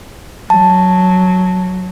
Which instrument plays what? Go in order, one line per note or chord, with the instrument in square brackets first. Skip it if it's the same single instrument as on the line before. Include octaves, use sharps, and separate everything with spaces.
[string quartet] F#3 [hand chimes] A5